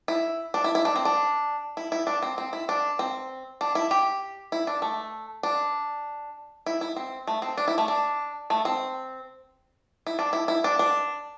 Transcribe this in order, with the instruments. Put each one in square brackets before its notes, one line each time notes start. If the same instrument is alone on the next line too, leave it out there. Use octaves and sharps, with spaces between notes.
[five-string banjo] E4
D4
E4
E4
D4
C4
D4
E4
E4
D4
C4
C4
E4
D4
C4
D4
E4
G4
E4
D4
A3
D4
E4
E4
C4
A3
C4
D4
E4
A3
D4
A3
C4
E4
D4
E4
E4
D4
D4